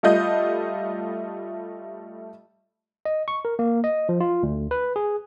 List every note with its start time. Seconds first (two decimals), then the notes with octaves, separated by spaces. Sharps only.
0.03 G3 A3 F4 D#5 G6
3.05 D#5
3.28 C#6
3.45 A#4
3.59 A#3
3.84 D#5
4.09 F3
4.20 F4
4.43 D2
4.71 B4
4.96 G#4